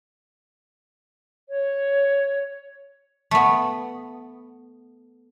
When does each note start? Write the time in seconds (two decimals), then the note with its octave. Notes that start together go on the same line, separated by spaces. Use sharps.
1.49 C#5
3.31 A3 B3